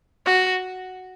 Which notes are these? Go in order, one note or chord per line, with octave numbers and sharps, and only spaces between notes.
F#4